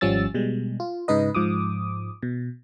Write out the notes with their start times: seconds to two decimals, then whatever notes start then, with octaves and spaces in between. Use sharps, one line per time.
0.01 G#1 F3 G3 C#4 E6 A6
0.34 B2 G3 G#3
0.80 F4
1.08 G#2 C#3 D#4 B4 D#5
1.35 G#2 F3 D6 D#6
2.23 B2